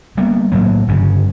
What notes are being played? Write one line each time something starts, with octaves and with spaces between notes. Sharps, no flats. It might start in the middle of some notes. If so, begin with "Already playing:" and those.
G3 A#3 B3
A2 F#3 A#3
G1 C#3